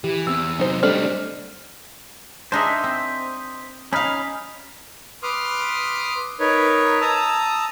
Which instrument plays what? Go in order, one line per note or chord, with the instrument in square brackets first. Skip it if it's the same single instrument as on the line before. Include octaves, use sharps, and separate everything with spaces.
[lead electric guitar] E3 [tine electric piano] G4
[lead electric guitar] E2 [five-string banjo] C4 [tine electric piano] E6
[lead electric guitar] C3 F#3 [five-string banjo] D#4 C5
[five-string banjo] G3 D4 A4 [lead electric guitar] A3 C4 [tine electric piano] C5 D#5 F6
[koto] D4 D#4 G#4 [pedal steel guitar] C5 D#5 E5
[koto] C4
[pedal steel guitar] C#4 B5 F6 [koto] D#4 F5
[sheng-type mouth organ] B4 C6 D6 D#6 F6
D#4 A#4 B4 C#5
A5 A#5 D#6 E6